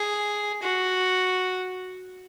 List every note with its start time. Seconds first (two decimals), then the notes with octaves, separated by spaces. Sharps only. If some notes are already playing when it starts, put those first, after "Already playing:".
Already playing: G#4
0.63 F#4